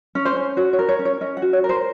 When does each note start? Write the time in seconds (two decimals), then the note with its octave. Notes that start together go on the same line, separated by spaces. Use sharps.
0.15 C#4
0.25 C5
0.36 C#4
0.57 F#4 C#5
0.73 C#5
0.79 A#4
0.89 C#5
0.99 C#4
1.05 C#5
1.21 C#4 D#5
1.37 F#5
1.42 F#4
1.53 C#5
1.64 A#4
1.69 C5